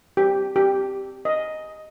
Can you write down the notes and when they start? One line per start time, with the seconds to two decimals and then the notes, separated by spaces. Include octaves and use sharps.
0.17 G4
0.56 G4
1.25 D#5